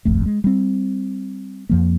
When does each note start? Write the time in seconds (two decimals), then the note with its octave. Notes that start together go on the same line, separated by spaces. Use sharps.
0.05 D#1 G#1 F2 A3
0.26 G#3
0.44 G3 C4
1.69 F2 F3 A#3